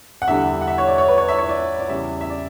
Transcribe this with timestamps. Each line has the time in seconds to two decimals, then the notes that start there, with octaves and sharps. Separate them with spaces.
0.22 F#5
0.27 E2 D3 G3 E5
0.61 F#5
0.68 E5
0.78 C#5
0.88 D5
0.98 C#5
1.08 B4
1.18 C#5
1.28 E5
1.38 C#5
1.49 D5
1.79 D5
1.89 E2 C#3 G3 E5
2.21 E5
2.30 D5